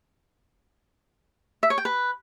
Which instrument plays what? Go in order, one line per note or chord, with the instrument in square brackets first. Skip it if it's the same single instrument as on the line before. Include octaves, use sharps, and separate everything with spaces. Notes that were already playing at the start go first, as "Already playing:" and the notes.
[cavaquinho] E5
C#5
G5
B4